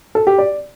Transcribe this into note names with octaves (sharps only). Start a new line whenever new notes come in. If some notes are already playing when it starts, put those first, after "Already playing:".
A4
G4
D5